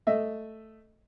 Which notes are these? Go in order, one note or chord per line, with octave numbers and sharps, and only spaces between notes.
A3 D#5 E5